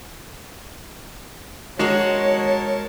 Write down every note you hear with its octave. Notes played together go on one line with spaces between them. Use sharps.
G#3 F#4 A#4 C#5 A5